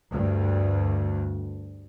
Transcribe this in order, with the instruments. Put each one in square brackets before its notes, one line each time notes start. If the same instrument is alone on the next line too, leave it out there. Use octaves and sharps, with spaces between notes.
[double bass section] D2 G2